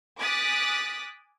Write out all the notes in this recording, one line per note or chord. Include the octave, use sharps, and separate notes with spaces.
G#5 D6 D#6 F#6 A6 B6